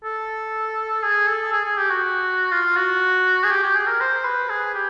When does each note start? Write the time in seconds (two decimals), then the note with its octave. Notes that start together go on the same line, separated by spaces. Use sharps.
0.04 A4
1.03 G#4
1.28 A4
1.52 G#4
1.65 G#4
1.77 G4
1.90 F#4
2.52 F4
2.76 F#4
3.44 G#4
3.50 G4
3.63 G4
3.75 G#4
3.87 A#4
4.00 C5
4.25 B4
4.49 G#4
4.74 G4